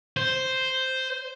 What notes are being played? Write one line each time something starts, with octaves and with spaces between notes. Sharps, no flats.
C5